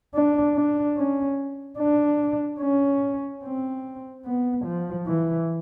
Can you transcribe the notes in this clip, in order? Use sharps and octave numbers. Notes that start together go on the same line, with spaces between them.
D4
D4
C#4
D4
C#4
C4
B3
F3
E3